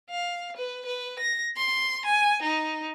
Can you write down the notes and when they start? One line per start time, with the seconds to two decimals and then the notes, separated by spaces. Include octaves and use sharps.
0.10 F5
0.56 B4
0.86 B4
1.19 A#6
1.57 C6
2.05 G#5
2.42 D#4